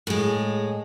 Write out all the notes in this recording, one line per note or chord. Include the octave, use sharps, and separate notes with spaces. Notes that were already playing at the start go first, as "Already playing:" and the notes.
A2 G#3